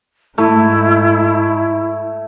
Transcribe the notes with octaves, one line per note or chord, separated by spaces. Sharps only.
G#2 A3 E4